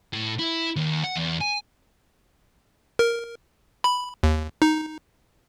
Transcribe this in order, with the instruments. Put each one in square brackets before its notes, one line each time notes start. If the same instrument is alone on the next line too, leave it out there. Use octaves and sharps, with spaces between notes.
[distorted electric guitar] A2
E4
D#2
F#5
E2
G#5
[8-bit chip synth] A#4
B5
D#2
D#4